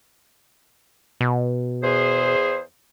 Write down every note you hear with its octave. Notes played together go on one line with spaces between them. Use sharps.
B2
E2 G#4 C5